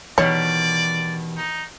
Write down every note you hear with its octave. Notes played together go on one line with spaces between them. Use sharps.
B2 D#3 E3 G3 C#5 D5
D#4